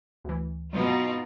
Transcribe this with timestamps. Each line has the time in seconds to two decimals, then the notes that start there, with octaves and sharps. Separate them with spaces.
0.24 D2 E3
0.73 B2 F#3 D#4 F4